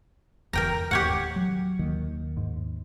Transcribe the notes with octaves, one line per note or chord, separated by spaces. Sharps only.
F1 E2 A#4 G5 A#5
D#2 A2 G4 C#5 F#5
F#3
D#2 D#3 A#3
G#2